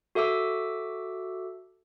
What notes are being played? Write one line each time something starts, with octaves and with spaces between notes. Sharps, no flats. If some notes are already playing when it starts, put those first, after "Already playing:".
F#4 A4 E5 D6 E6